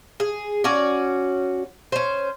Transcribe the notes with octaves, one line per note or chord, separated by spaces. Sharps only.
G#4
C#4 F#4 D5
C#4 C5